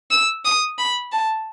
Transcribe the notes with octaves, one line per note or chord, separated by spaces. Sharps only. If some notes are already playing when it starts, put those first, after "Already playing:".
E6
D#6
B5
A5